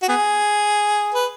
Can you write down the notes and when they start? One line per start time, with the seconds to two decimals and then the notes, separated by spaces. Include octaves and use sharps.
0.02 F#4
0.09 B3 G#4
1.14 B4